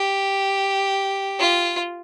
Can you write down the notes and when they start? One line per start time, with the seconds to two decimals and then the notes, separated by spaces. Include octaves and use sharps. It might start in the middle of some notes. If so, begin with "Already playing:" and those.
Already playing: G4
1.40 F4